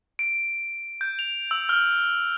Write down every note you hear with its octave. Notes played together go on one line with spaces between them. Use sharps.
D7
G6
F7
E6
F6